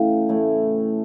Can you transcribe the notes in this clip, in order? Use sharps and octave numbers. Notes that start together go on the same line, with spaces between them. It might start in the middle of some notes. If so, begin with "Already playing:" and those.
Already playing: C#3 E3 A3 F5 G5
A2 E3 A3